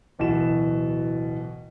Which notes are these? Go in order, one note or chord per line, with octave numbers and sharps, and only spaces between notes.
D1 B2 E3 E7